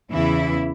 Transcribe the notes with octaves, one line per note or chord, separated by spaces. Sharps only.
E2 C#3 E3 E4